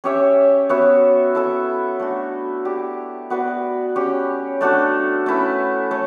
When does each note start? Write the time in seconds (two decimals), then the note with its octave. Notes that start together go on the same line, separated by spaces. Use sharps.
0.04 C#4 G4 C#5 E5
0.69 B3 F#4 C#5 E5
1.35 E4 A4 E5
2.00 A3 D4 F#4
2.65 E4 G4 D5
3.30 B3 F#4 B4 D5
3.96 C#4 G4 C#5
4.61 A3 D4 F#4 A4
5.26 A3 C#4 E4 B4
5.91 A3 A4 C#5